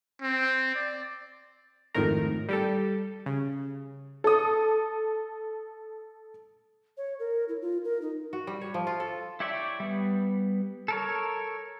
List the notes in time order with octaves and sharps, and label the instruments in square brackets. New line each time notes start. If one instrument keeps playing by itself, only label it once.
[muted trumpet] C4
D5
[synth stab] G#1 F2 A2 D#3 A#4
G3 G4 A4
C#3
[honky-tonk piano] A4 D#6
[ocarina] C#5
A#4
E4
F4
A#4
D#4
[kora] F#4
G3
C#5
F3
F4
A4
[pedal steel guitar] E4 G4 C#5 D5 E5
G3 B3
A4 A#4 C#5